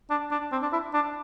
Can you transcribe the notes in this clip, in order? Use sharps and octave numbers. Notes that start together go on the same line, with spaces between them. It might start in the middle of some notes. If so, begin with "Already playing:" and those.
D4
D4
C4
D4
E4
D4